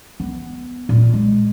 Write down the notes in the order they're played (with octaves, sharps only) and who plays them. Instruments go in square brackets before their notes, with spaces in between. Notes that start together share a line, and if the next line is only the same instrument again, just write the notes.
[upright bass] B3
A#2
G#3